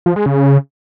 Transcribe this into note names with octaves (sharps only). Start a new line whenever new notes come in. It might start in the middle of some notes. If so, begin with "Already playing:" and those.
F3
G#3
C#3